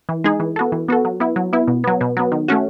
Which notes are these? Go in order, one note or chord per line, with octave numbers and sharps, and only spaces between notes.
E3
G#3 D#4 G#4
E3
B3 F#4 A4
E3
B3 F#4 A4
F#3
B3 E4
F#3
B3 E4
B2
F#3 B3
B2
F#3 B3
D#3
A3 C#4 F#4